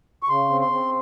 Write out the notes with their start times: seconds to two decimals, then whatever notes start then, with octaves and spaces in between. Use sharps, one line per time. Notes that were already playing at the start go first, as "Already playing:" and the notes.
0.23 C#6
0.29 C#3 C6
0.50 C4
0.61 C6
0.72 C4